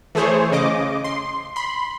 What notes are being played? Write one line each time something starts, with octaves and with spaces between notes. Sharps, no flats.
E3 A3 G#4 C5 C#5
C#3 D#5 D6
C6
B5 C6